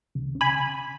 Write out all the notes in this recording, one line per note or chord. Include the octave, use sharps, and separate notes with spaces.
C#2
C#3
G#5 B5